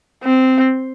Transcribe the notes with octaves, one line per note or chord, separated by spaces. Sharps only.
C4